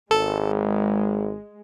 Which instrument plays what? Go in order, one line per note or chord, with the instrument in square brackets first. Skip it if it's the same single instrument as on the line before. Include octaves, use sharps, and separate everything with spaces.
[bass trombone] G#1 [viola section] G#3 [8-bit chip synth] A4